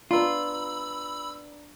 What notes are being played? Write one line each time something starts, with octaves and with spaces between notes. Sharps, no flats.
B3 D4 F4 A#5 B5 E6